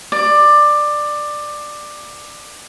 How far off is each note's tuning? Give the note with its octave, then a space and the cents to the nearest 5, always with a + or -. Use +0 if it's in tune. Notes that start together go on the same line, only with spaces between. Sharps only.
D5 +15